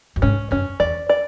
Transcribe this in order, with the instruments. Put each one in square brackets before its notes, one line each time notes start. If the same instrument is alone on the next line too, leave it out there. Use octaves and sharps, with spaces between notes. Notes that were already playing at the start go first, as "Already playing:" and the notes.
[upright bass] F#2
[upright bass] G#2 [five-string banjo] C#4
[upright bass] F#2 [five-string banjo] C#4
[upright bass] E2 [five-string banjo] D5
[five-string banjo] D5